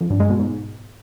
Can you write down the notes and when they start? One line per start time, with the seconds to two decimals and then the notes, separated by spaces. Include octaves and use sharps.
0.01 F2
0.10 G2
0.20 G#3
0.29 B2
0.39 G#2